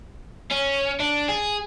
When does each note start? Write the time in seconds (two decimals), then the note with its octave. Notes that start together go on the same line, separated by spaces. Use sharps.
0.51 C#4
1.00 D4
1.29 G#4